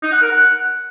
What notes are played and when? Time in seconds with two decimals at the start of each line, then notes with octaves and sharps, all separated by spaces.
0.03 D#4
0.12 F#5
0.22 A#4
0.31 F#5